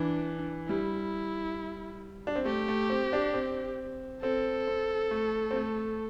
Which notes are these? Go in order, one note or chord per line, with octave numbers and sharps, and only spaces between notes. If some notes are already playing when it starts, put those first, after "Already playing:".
Already playing: E3 D4
G3 E4
D4
C4
A3 G4
A3
C4
D4
C4
C4 A4
C4
A3
C4
A3